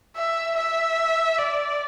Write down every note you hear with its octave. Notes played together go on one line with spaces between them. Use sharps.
E5
E5
D5